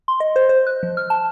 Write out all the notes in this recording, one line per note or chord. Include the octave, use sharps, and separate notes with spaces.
C6
D#5
C5
C5
F#6
F3
F6
A5